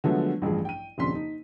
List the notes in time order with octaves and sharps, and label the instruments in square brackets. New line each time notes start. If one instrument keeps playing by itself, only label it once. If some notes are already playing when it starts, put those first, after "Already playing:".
[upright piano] D3 F3 F#3 G#3 A3 B3
A1 G2 F3 G#4
G5 D#7
D#1 F2 C#3 D4 C6 B6
D#4